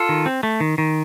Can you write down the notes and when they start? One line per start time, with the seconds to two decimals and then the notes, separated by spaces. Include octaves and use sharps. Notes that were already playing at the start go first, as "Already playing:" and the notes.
Already playing: F4 A4
0.09 D#3
0.26 C4
0.43 A3
0.60 D#3
0.78 D#3